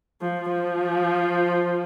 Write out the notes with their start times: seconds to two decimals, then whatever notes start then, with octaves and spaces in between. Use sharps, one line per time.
0.22 F3
0.51 F3